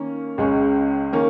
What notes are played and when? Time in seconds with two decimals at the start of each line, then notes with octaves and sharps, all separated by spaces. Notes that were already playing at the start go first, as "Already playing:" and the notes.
Already playing: D#3 A#3 C#4
0.38 C#2 C#3 G#3 C#4
1.12 D#3 A#3 C#4